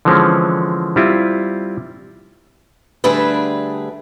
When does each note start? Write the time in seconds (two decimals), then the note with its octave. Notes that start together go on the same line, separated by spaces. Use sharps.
0.05 D3 E3 F3 G#3 C4 C#4
0.96 G3 C4 E4 F4
3.04 D3 G3 A3 D4 G#4 B4